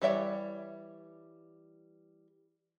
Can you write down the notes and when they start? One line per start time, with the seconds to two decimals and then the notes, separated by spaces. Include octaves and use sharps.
0.02 E3 G3 C#5 E5 G5